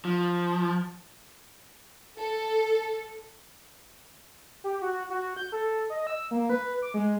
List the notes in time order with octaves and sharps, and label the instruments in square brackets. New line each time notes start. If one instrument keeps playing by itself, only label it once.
[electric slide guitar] F3
[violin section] A4
[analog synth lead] G4
F#4
F#4
G6
A4
D#5
E6
A#3
B4
D6
G#3